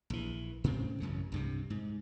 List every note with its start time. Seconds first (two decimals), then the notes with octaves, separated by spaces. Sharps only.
0.10 A#1 E3
0.64 A2 C#3 C4
1.00 A1 F#2 C#3
1.32 C2 G2 C3
1.70 G#2